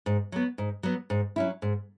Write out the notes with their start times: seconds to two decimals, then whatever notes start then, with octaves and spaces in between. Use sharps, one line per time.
0.06 G#2
0.32 F#3 B3
0.58 G#2
0.83 F#3 B3
1.10 G#2
1.36 F#3 C#4 E4
1.62 G#2